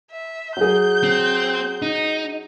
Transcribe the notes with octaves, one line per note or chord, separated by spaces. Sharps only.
E5
F#3 G#4 G6
C4
D#4